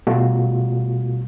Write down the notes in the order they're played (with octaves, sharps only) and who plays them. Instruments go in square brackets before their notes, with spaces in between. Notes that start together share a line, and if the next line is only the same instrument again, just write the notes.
[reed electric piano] B2 G3 A3 F4 F#4